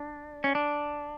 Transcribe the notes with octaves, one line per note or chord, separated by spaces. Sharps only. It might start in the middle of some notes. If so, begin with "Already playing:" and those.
Already playing: D4
C#4
D4